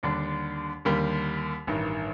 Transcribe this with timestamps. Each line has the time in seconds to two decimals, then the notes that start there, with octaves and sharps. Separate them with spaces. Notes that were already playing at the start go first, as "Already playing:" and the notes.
0.03 D#2 D3 G3 D4
0.85 D#2 D3 G3 A#3
1.67 A1 G2 D#3